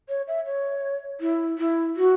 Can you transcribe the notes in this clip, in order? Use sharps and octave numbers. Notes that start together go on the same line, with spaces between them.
C#5
E5
C#5
E4
E4
F#4